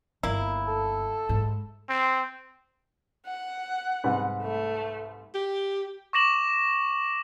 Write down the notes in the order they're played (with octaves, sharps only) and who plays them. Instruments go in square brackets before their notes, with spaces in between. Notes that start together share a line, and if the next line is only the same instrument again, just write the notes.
[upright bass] G1 [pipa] A#3 E4
[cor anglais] A4
[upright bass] G#2
[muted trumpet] C4
[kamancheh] F#5
[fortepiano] C2 G#2 B4
[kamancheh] A3
[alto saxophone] G4
[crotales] C#6 D6 A#6 E7 F#7